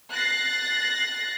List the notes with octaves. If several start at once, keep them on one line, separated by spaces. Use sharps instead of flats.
F#6 A6 A#6 C7